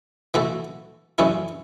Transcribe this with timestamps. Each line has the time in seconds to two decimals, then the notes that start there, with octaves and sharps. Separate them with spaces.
0.34 E3 A3 F#4 A4
1.18 F#2 E3 C#4 E4 A4